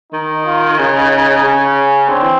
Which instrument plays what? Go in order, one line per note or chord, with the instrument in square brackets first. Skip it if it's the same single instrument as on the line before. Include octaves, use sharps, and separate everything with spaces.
[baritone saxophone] D#3 [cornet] D#4
[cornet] F4
[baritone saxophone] C#3 [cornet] D#4
[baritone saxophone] C#3 [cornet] C#4
[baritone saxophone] D3 [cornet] C4
[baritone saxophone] E3